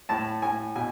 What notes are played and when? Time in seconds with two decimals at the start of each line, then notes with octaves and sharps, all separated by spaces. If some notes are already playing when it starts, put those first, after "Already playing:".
0.09 A2 A5
0.42 A2 G#5
0.75 B2 G#5